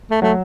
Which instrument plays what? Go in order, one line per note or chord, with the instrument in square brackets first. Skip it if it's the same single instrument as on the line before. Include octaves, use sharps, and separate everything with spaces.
[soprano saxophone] A3
[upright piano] F#3 [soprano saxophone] A3